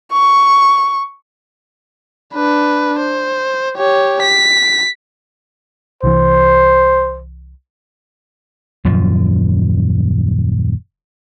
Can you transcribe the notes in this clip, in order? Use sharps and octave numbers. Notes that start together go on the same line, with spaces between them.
C#6
D4 B4
C5
G4 C#5
B6
C2 E3 C5
D#1 F#2 F3